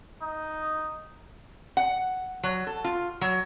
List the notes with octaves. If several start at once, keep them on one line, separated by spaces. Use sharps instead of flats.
D#4
F#5
F#3
A4
F4
F#3